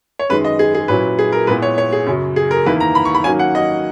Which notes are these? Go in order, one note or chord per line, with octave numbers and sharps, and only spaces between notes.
C#5
F#2 D#3 G#3 B4
D#5
G#4
G#4
A#2 F#3 C#4 E4 B4
G#4
A#4
A#2 G#3 B3 E4 B4
C#5
C#5
G#4
F#2 C#3 F#3
G#4
A#4
E2 D#3 A#3 E4 B4
A#5
B5
C#6
B5
D#3 F#3 A#3 C#4 G#5
F#5
D#5